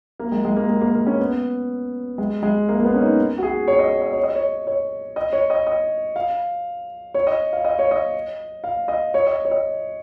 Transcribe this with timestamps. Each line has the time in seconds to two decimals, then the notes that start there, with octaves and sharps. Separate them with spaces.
0.20 A#3
0.32 G#3
0.45 G#3
0.57 A#3
0.69 G#3
0.81 A#3
0.95 A#3
1.07 C#4
1.20 B3
2.18 G#3
2.43 G#3
2.69 A#3
2.80 A#3
2.84 B3
2.95 C#4
3.01 D#4
3.38 F#4
3.43 G#4
3.68 C#5
3.79 D#5
3.89 C#5
4.02 D#5
4.13 C#5
4.23 D#5
4.35 C#5
4.67 C#5
5.16 D#5
5.33 C#5
5.50 D#5
5.67 D#5
6.16 F5
7.14 C#5
7.27 D#5
7.53 F5
7.65 D#5
7.79 C#5
7.91 D#5
8.64 F5
8.88 D#5
9.14 C#5
9.27 D#5
9.45 C#5
9.51 D#5